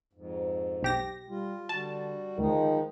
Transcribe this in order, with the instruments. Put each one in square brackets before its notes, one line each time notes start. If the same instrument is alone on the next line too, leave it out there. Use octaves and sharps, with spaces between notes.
[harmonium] F2 G#2
[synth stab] B1 G4 A#6
[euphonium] G3 [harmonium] F4
[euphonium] D3 [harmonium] G3 F#4 [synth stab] A5
[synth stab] D2 [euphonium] D#3 [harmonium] F3 G#3 D#4